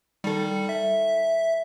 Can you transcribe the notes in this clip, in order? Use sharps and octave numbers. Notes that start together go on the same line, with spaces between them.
D#3 G3 A4
E5